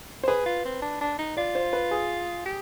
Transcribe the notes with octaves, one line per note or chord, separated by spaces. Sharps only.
C5
G#4 B4
F4
C4
D4
D4
D#4
F4 D5
C5
B4
G#4
G4